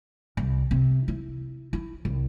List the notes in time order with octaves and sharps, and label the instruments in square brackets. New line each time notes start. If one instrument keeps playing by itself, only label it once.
[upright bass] C2
C3
E4
E4
C2